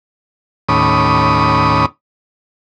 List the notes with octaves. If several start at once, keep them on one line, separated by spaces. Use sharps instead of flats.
D#2 A2 C#4 B5 D6 D#6